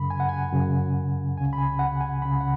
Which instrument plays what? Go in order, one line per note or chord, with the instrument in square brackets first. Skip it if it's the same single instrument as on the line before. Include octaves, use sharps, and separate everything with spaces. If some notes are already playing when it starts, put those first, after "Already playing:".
Already playing: [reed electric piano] F#2 C#3 B5
G#5
F#5
G#5
F#2 C#3
C#2 G#5
C#3
B5
G#5
F#5
G#5
C#2 C#3 B5
F#5